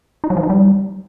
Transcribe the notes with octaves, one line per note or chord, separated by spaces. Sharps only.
D#4
F#3
F3
D#4
G3